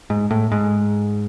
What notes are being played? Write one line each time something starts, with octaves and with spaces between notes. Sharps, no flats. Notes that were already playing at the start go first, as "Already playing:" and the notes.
G#2
A2
G#2